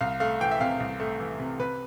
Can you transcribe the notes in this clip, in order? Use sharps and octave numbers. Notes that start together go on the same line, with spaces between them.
C2 F5
A3 F5
E3 G5
E5
C3 F5
C2
A3
E3
C3
C3 B4